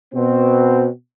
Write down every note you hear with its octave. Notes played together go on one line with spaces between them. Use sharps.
B2 C4